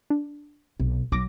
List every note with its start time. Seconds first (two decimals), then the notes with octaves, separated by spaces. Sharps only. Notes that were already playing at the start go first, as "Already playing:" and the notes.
0.10 D4
0.80 B1 C3
1.12 B1 F#3 D6 A#6